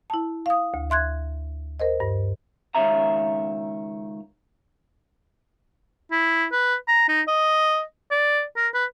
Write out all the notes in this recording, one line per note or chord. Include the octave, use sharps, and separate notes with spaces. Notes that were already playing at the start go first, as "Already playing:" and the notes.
E4 A5
F5 D#6
D2
E5 C6 F#6 G#6
A#4 C5 D#5
G2
C#2 G#2 D#3 C#5 E5 A#5
E4
B4
A#5
D#4
D#5
D5
A#4
B4